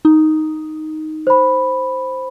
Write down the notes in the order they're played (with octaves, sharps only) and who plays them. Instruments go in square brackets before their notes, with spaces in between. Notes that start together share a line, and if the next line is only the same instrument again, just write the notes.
[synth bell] D#4
[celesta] C5 B5